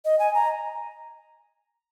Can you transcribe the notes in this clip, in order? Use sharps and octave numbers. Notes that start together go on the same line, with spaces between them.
D#5
G#5
A#5